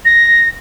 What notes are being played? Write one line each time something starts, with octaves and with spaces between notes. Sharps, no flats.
A#6